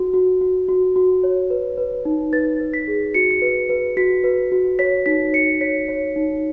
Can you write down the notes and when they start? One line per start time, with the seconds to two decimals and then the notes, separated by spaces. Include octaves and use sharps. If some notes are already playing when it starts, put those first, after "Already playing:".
Already playing: F#4
0.14 F#4
0.41 F#4
0.69 F#4
0.96 F#4
1.24 C#5
1.50 B4
1.78 B4
2.05 D#4
2.33 B4 A6
2.60 B4
2.74 B6
2.88 G#4
3.14 F#4 C#7
3.31 C#7
3.42 B4
3.69 B4
3.97 F#4 B6
4.24 B4
4.52 F#4
4.79 C#5 B6
5.06 D#4 B6
5.33 C#5 C#7
5.61 C#5 B6
5.88 C#5
6.16 D#4